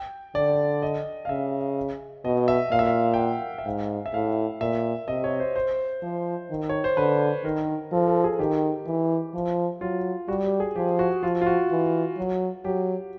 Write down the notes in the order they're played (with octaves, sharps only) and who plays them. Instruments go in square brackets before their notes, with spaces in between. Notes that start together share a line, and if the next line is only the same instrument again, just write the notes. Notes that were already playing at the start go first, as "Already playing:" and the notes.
Already playing: [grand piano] G5
[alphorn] D3 [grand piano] D5
[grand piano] D#5
F5
[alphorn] C#3 [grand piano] E5
[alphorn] B2 [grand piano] D#5
[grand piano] E5
[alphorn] A#2 [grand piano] F5
[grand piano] E5
F5
G5
F#5
E5
[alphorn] G#2 [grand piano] F5
[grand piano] E5
[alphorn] A2 [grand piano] F5
[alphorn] A#2 [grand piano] E5
[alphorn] C3 [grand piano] D#5
[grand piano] C#5
C5
C5
[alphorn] F3
D#3
[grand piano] C#5
C5
[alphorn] D3 [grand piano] B4
[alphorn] D#3 [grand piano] A#4
[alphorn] F3 [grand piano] A4
[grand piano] A4
G#4
[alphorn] D#3 [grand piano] G4
[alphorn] E3
F3
[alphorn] F#3 [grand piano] F4
[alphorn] G3 [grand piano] F#4
[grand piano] G4
G#4
[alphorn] F3 [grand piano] G4
[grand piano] F#4
[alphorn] F3 [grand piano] F4
[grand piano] F4
F#4
[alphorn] E3
F#3
[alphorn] F#3 [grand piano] G4